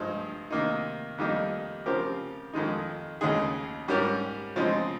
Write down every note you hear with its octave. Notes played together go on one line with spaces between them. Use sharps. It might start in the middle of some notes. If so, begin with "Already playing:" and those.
Already playing: G2 F3 G#3 D#4
C3 D#3 A#3 D#4
F2 D#3 G3 A#3 D#4
C#3 F3 C4 G4 A#4
F2 D#3 G#3 D#4
D#2 C#3 G#3 D#4 G#4
G#2 G3 C#4 G4 A#4
C#3 F3 G#3 C4 D#4